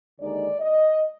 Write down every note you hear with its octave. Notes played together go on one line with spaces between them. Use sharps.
D#2 D3 G#3 D#4 D5
D#5